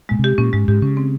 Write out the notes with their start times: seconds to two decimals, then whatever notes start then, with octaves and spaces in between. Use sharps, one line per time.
0.09 A#2 G#3
0.19 C3
0.24 G4
0.38 A#2 C#4
0.53 G#2 G#3
0.68 G#2 G4
0.82 C#3 C#4
0.97 C4